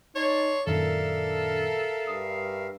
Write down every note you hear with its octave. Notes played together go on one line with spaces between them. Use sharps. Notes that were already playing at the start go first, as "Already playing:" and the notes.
D#4 C#5 D5 A5 C6
F#2 A#2 D#3 D4 A4 A#4 E5 F5
G2 D#6 C7